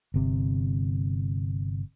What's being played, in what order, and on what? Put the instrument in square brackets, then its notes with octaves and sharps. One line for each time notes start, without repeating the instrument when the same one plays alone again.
[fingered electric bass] G1 C3